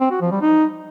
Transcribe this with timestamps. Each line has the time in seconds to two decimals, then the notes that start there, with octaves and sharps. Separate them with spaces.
0.01 C4
0.11 F#4
0.21 F3
0.31 G3
0.41 D#4